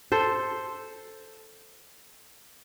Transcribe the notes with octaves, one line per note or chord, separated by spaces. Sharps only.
A4 C5